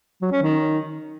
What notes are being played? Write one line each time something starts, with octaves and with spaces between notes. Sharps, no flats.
F#3
C#4
D#3